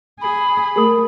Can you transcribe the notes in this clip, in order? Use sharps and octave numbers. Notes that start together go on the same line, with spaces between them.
G#4 B5
A3 G#4 A#4 D#6